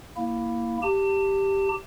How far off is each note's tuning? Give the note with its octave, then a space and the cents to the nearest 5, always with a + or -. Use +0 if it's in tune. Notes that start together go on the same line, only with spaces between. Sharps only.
A#3 +0 E4 +0
G4 +0 A5 +35